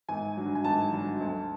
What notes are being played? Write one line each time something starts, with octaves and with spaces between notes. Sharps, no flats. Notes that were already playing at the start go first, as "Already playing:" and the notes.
G#1 G#5
G2 D3 F#3
G#5
G#1 A5
G2 D3 F#3
D2